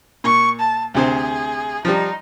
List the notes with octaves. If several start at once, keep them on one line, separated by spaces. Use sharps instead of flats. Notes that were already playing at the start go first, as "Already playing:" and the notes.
A#2 C#6
A5
D2 C3 G#4 C5
F3 G3 D#4